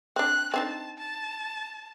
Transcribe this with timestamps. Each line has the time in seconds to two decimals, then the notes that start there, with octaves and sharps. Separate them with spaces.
0.16 C4 D4 F#6
0.54 C4 D4 D#4 A5
0.98 A5